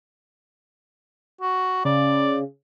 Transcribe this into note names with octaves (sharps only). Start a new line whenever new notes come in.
F#4
C#3 D5